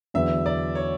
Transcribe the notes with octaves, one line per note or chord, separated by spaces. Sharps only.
E2 D3 F#3 B3 E5
D5
C#5